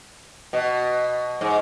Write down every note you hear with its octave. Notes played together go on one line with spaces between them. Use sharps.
B2
G#2